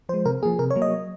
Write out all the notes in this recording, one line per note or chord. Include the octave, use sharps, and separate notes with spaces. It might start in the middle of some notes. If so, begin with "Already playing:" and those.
F3 G#3 C5
C3 A#4
F3 A#3 G#4
C3 A#4
C#5
F#3 A#3
D#5